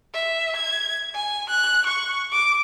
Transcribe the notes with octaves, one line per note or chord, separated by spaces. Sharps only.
E5
G#6
G#5
F#6
C#6
D6